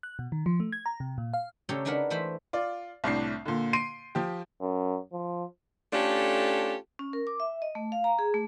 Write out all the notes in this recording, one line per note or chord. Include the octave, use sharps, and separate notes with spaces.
F#6
B2
D#3
F3
A3
G#6
A#5
C3
A#2
F5
C#3 A3 G4 A4 C#5 A#5
G#3 D4 D#4 A#4 B4 F#5
E3 A3 C5 E5 B5
F4 D5
C2 A2 D4 C7
A#2 D3
C6 C7 D7 D#7
F3 G4
F#2
F3
A3 C#4 D4 F4 G4 A4
C#4
A#4
D6
E5
D#5
A3
F5
A#5
G#4
A3